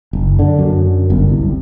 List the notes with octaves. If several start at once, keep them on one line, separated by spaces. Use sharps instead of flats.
F#1
D3
F#2
G1
C2